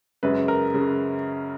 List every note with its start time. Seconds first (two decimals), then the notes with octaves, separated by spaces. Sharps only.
0.23 F#2 C#3 G#3 B4
0.48 A#4
0.74 C#3